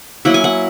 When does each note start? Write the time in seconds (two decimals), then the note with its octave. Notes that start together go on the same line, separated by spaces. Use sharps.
0.25 F#3 A#3 E4 F#5
0.34 G#5
0.44 F#5